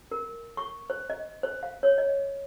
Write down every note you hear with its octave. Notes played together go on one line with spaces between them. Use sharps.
A#4
C#6
C5
D#5
C5
F5
C#5
D#5